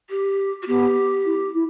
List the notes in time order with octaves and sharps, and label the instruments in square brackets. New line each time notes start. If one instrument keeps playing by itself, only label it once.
[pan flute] G4
F#4
[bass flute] B3 [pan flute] G4
[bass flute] E4
E4